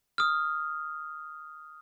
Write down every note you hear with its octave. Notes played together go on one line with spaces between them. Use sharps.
D#6 F6